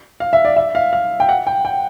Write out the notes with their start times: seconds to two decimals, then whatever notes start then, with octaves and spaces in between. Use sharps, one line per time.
0.20 F5
0.33 E5
0.45 D5
0.56 E5
0.75 F5
0.93 F5
1.20 G5
1.29 F#5
1.47 G5
1.65 G5